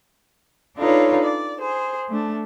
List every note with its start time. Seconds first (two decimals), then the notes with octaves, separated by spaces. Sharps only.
0.78 D4 D#4 F4 A4 B4 C#5
1.24 D5
1.60 G#4 C5
2.09 A3 D4